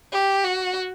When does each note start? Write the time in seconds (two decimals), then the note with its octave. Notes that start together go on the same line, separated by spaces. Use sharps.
0.12 G4
0.44 F#4